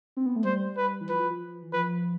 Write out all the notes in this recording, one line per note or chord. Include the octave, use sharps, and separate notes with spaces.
C4
B3
A3
G3 C5
B4
E3
F3 B4
F3
F3
E3
F3 B4